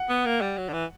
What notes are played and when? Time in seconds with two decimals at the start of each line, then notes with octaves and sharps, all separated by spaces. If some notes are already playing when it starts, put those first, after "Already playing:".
Already playing: F#5
0.09 B3
0.26 A#3
0.41 G3
0.58 F#3
0.68 D3
0.73 E3